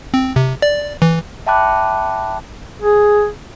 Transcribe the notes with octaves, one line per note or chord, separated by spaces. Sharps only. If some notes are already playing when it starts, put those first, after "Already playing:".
C4
C3
D5
E3
E5 G5 A5 B5 D6 F#6
G#4